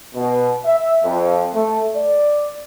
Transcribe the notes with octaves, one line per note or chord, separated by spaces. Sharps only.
B2
E5
F2
A3
D5